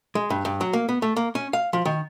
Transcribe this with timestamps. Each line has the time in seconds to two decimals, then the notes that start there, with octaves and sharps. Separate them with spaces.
0.15 G#3
0.30 G2
0.45 G2
0.61 F#3
0.73 A#3
0.89 B3
1.02 A3
1.16 A#3
1.35 C#4
1.53 F5
1.73 F3
1.85 D#3